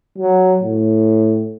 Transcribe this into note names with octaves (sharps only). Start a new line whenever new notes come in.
F#3
A2